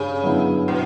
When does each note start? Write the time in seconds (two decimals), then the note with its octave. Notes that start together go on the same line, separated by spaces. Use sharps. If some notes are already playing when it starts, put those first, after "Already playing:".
Already playing: G2 C#3
0.23 D3 F#3 B3 E4
0.68 B2